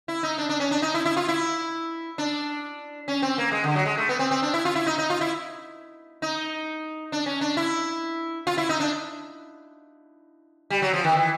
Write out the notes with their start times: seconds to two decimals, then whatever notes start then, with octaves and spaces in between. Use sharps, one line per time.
0.08 E4
0.23 D#4
0.38 D4
0.49 D4
0.60 C#4
0.71 D4
0.82 D#4
0.94 E4
1.05 E4
1.16 F4
1.28 E4
2.18 D4
3.08 C#4
3.22 C4
3.38 A#3
3.52 G#3
3.64 D3
3.75 F#3
3.85 G#3
3.97 A3
4.09 B3
4.19 C4
4.31 C4
4.42 D4
4.54 E4
4.65 F4
4.76 E4
4.87 D#4
4.98 D#4
5.10 F4
5.21 E4
6.22 D#4
7.12 D4
7.26 C#4
7.41 D4
7.57 E4
8.47 F4
8.58 E4
8.69 D#4
8.80 D4
10.70 G3
10.82 F#3
10.94 F3
11.04 D#3
11.16 E3